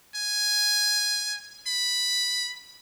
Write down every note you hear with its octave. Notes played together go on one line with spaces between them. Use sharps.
G#5
B5